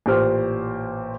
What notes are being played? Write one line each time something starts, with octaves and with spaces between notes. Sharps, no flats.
A1 A#2 G4 C5 F6